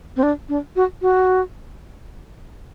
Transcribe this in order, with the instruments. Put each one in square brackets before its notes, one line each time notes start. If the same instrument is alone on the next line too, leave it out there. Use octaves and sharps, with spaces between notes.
[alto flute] C4
D4
D4
F#4
F#4